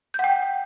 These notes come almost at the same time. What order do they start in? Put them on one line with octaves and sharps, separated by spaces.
G6 F#5 G5